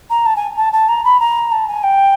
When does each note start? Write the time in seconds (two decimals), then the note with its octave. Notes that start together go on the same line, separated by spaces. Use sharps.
0.10 A#5
0.26 A5
0.36 G#5
0.57 A5
0.73 A5
0.88 A#5
1.04 B5
1.20 A#5
1.52 A5
1.68 G#5
1.83 G5